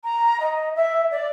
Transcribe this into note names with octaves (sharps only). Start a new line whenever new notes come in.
A#5
D#5
E5
D5